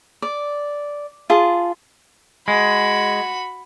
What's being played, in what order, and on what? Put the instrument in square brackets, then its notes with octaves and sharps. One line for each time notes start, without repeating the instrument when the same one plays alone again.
[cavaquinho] D5
F4 G#4 A5
[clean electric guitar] G#3 [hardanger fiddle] F#4 B5